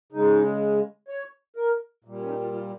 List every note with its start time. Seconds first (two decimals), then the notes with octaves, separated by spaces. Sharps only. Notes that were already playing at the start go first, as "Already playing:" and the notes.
0.12 C#3 G#3 D#4
1.08 C#5
1.56 A#4
2.04 A#2 G3
2.19 C#4
2.29 D#4
2.41 F4
2.53 F4